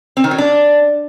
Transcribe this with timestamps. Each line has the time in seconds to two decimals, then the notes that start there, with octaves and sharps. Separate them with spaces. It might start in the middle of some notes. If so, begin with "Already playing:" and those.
0.17 C4
0.24 D#3
0.31 F#3
0.38 D4